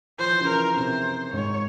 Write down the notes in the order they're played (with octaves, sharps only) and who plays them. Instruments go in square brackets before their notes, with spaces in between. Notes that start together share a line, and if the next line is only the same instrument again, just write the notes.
[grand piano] F3 [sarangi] C5
[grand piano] E3
C#3
[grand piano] E3 [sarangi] A#4
[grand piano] C3 [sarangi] C5
[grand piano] G#2 [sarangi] C#5